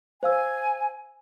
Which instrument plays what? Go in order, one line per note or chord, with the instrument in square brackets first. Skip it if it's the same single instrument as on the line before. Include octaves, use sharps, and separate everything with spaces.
[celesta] C5 F5 E6 [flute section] G#5